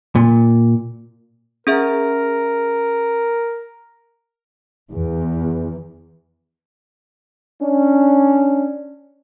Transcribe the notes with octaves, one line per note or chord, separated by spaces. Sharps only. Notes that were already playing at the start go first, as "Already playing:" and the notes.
A#2
C#4 G#4 A#4 E5
E2
C#4 D4